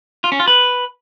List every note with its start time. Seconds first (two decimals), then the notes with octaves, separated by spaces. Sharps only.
0.24 F4
0.32 C#4
0.40 F4
0.48 B4